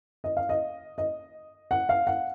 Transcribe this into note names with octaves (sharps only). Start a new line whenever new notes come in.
D#5
F5
D#5
D#5
F#5
F5
F#5